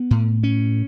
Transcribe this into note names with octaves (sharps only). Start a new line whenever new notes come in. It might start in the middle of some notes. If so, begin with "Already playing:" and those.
Already playing: B3
A2
C#4